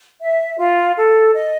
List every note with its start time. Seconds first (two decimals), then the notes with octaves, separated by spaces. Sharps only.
0.20 E5
0.58 F4
0.96 A4
1.34 D#5